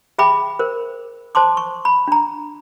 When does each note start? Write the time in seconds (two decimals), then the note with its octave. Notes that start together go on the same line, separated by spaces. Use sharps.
0.18 G#4 E5 G5 B5 D6
0.59 A#4 C5
1.35 C5 A5 C6 D6
1.57 C#6
1.85 B5
2.08 D4 A#5